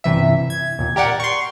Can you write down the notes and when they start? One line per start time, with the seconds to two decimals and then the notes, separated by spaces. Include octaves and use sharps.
0.04 G1 C3 E3 E5
0.50 G#6
0.78 D#2 A#2
0.96 G4 A#4 D5 F#5 G5
1.20 C6 C#6